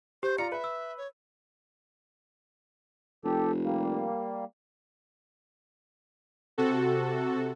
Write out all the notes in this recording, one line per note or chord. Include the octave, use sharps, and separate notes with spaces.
G4 C5
F4 D5 A#5 C#7
B4 E5
E6
C#5
F1 G4 A4
G3 A#3
C3 F#4 A4